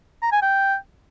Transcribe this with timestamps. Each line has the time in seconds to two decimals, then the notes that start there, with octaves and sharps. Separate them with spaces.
0.23 A#5
0.32 G#5
0.42 G5